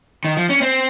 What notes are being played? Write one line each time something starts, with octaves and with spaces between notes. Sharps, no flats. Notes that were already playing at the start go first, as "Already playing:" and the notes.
D#3
F3
C#4
C4